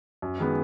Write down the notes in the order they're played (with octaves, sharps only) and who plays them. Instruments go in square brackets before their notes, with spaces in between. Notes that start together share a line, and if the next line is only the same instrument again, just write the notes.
[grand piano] F#2
D#3 G#3 B3